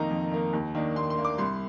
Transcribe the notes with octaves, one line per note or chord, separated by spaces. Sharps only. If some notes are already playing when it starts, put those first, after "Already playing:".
Already playing: F2 D#3 A#3 D#4 A#5
F2
D#3 A#3 D#4
D#2
D#3 A#3 D4
D#2 C6
C6
D#3 A#3 D4
D6
C2 C6